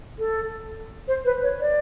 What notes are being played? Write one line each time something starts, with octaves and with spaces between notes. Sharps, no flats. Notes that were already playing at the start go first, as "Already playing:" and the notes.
A4
C5
B4
C#5
D5